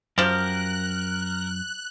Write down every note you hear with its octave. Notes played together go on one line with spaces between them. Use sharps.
F#2 F3 G4 A#4 F#6